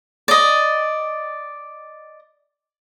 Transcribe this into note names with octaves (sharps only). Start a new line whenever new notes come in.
D5 D#5